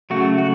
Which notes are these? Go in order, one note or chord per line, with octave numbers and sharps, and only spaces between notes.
C#3 F#3 A3 F#4
F#4